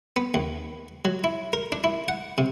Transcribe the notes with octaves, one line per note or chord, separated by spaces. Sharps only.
B3
D#2
F#3
E4
A#4
D4
E4
F#5
C3